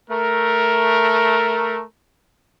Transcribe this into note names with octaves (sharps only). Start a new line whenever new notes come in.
A3 A#4